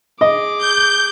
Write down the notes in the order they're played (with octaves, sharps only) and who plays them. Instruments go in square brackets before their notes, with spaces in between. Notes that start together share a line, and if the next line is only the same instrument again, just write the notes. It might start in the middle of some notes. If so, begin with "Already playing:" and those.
[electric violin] G#4 D6 [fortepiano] D#5
[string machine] G6